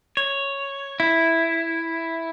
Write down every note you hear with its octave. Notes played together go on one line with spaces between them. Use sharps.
C#5
E4